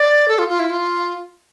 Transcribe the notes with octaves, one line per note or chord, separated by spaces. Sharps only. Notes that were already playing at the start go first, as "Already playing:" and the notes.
Already playing: D5
A4
F4
F4
E4
F4